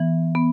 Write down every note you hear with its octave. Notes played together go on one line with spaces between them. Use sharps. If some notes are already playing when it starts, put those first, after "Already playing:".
Already playing: E3 B3
B3